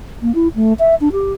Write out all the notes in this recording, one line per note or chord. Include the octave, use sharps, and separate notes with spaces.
A#3
E4
A3
E5
D4
G4